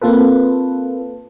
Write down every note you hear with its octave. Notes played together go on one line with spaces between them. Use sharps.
A#3 C4 F4 A4 B4